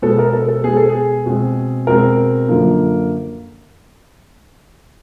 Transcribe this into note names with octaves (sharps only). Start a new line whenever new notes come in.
B2 G#3 B3 A4
A#4
A4
A4
B2 G#3 B3 G#4
A4
G#4
B2 G#3 C4
B2 G#3 C4 A#4
F#2 D3 F3 A#3